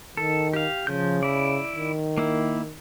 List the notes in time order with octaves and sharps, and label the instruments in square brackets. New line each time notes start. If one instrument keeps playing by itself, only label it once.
[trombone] D#3 [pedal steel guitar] A4
[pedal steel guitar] G4 F5
[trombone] C#3 [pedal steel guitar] F3 G6
[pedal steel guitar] E4 D5
[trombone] D#3
[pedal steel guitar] A#3 E4